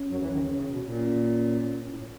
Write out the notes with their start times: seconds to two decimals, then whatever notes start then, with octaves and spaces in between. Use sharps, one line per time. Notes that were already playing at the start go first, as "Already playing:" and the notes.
Already playing: C#4
0.09 F#2 F#3
0.20 E2 E3
0.31 D#2 D#3
0.42 C#3
0.54 C#3
0.68 B2
0.83 A#2
0.99 C#4
1.88 A2